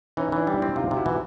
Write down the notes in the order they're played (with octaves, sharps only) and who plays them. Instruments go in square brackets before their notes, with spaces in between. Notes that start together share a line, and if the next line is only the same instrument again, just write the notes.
[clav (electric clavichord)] E3 [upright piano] C#4 D#4
[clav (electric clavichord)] E3 [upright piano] D4 E4
[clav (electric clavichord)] G3
[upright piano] D4 E4
[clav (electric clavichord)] C4
[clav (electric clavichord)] C3 [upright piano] D#4 F4
[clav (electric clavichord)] C3
[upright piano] E4 F#4
[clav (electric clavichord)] E3